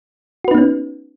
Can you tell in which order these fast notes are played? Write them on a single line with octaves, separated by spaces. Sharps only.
F#4 B4 D#4 B3 C#4